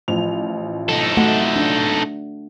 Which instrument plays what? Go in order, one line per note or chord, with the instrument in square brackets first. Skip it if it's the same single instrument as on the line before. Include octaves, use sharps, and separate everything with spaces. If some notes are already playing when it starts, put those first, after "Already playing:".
[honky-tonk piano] A1 F3 F7
[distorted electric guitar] D#4 A4
[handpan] A3 F#4 F#5
D4